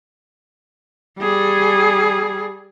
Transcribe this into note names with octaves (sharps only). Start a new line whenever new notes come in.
G3 G#4